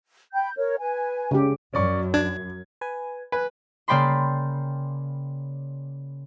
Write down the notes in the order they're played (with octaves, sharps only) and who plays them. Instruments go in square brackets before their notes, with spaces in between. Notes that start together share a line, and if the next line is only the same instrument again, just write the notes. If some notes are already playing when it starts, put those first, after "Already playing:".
[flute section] G5 B5 G6
A#4 C#5
B4 G#5
[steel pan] C#3 G4
[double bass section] F#2 [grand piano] C#4 D5 C#6
[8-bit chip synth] D4 [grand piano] G#6
[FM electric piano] B4 G#5
[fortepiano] B4 [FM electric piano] G#5
[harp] C#3 A#3 D5 G5 B5 C6